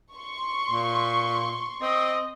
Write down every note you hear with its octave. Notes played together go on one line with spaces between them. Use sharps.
C6 C#6
A#2
C4 D#5